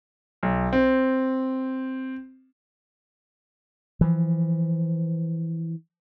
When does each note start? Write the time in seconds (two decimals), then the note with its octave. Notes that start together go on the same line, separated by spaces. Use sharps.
0.43 B1
0.73 C4
4.01 E3 F3